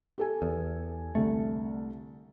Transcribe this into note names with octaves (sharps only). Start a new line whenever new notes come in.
G4 A4 G#5
E2
C2 D3 A3